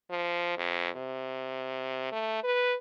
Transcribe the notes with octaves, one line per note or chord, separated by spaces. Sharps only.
F3
F2
C3
A3
B4